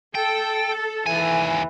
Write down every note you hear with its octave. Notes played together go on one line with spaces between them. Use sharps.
A4 G5
D#2 E3 G#5